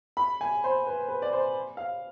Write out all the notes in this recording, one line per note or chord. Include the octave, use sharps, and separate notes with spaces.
B5
G#5
C5
B4
B4
D5
C5
F5